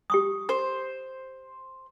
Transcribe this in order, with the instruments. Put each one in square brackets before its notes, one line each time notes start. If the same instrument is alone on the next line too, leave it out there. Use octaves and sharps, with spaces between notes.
[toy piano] G4 C#6 D#6
[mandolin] C5